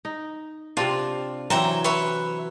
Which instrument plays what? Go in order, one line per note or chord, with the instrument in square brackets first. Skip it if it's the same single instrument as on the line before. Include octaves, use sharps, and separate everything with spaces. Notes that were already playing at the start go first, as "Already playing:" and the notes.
[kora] D#4
[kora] C3 C4 D4 [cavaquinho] F4
[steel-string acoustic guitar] E3 F#3 [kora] C4 [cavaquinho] E5 G5 A#5
[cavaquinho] B4 C#5 E5